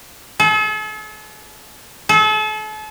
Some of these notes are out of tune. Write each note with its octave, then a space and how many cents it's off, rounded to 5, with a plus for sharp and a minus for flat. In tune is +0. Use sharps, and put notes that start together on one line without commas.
A4 -45
A4 -40